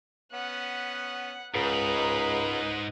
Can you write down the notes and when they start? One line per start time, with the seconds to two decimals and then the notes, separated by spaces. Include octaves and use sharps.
0.33 B3 C#4 F#5
1.55 C#2 G#2 A#4 B4 D#5 B5